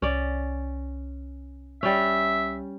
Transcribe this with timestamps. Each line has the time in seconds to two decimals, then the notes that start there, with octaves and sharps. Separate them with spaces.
0.02 C2 C#4 D5
1.83 G3 C#4 E5